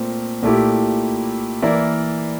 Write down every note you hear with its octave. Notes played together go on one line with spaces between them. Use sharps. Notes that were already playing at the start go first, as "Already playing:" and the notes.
Already playing: A#2 A3 C4
A#2 A3 E4 G4
E3 A#3 E4 A#4 D5